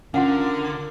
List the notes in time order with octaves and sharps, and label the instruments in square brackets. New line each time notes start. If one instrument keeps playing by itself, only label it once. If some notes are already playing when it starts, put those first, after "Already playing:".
[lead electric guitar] D3 [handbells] C#4 F4 [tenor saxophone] A#4 [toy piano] F5 F#5